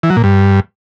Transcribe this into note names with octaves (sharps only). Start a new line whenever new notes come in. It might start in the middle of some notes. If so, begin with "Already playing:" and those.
E3
F#3
A#2
G2